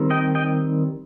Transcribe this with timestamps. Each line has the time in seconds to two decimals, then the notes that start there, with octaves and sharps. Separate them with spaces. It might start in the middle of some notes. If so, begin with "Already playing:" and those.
Already playing: D#3 G3 C4
0.10 D#5 G5
0.35 D#5 G5